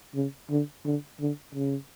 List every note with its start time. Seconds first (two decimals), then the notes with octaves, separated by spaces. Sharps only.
0.15 C#3
0.50 D3
0.85 D3
1.20 D3
1.55 C#3